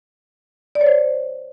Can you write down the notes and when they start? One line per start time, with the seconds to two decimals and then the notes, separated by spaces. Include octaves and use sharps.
0.75 D5
0.81 C#5
0.87 C5